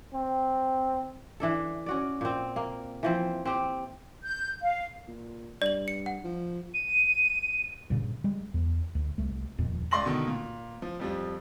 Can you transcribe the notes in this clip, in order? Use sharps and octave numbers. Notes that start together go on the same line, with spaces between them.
C4
E3 D4 A4
C#4 F#4 D5
A#2 C4
A#3
E3 F3 C4
C4 G4 G5
G6
F5
A#2
G2 D5 F#7
C#7
F#5
F3
D#7
G2 A#2 C#3
G3 G#3
E2
D2
C2 A3
D#1 F2 A#2
C#2 D5 C6 A#6 F#7
B2 D3 D#3
A#2
F3
F2 F3 G3